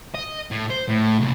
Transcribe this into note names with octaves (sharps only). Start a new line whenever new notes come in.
D#5
A2
C5
A2
C2 A#2